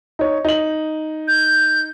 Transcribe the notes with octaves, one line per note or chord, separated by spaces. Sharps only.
D#4 C#5
D#4 F#7
G6